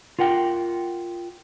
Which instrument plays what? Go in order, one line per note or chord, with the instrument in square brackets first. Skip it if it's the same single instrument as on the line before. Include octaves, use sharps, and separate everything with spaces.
[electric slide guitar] F4 A#4 F#5 G5